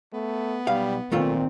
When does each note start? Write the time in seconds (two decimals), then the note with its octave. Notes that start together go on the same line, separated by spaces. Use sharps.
0.13 A3 B3
0.67 B1 G3 F5
1.12 B1 A#2 D#3 A3 C4 F4